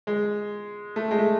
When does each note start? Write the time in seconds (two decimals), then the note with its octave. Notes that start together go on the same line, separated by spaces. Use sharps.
0.07 G#3
0.96 A3
1.11 G#3
1.18 A3